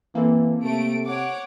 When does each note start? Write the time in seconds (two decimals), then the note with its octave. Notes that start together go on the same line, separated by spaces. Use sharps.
0.15 E3 A#3 C4 A4
0.63 C3 A3 D7
1.06 C#5 F#5 D6